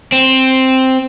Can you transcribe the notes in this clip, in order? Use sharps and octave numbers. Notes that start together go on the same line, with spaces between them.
C4